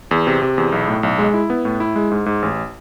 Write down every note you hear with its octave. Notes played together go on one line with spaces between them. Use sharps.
E2
C3
C3
E2
B1
A2
B1
G#3
E4
B3
A2
E4
G#3
G#2
G#2
A1